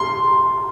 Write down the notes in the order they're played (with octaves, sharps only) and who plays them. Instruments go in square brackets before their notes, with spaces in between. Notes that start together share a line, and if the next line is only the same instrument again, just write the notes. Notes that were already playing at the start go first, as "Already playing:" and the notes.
Already playing: [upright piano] C6